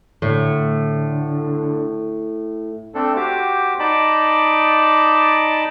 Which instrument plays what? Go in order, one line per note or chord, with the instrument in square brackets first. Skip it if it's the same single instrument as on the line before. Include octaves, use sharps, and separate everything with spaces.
[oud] A2 [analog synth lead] D3
[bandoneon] A3 C4 D4 A4
F#4 G4 C5 D6
D#4 D5 D#5 A5 B5 D6